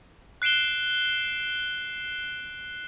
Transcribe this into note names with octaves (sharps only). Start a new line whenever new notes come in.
F#6 C7 D7 E7 G7